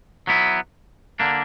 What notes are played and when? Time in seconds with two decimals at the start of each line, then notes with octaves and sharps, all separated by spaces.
0.27 F#3 B3 E4
1.20 D3 A#3 D4